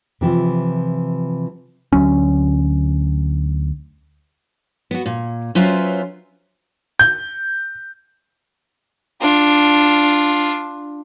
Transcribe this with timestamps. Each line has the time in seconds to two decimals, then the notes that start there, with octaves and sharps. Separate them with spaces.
0.21 C3 E3 F3
1.92 D2 F#3 C#4
4.91 B3 F#4
5.06 A#2
5.55 F#3 C#4 F4 B4 C5 E5
6.99 G6
9.21 D4 F4